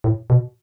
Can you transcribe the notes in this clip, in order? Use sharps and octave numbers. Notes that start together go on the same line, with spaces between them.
A2
B2